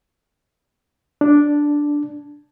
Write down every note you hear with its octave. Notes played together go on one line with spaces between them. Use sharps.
D4